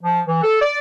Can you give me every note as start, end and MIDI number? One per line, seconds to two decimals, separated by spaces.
0.03 0.20 53
0.28 0.40 52
0.43 0.60 69
0.62 0.78 74